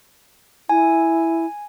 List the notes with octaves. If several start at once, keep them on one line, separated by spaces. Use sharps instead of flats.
E4 G#5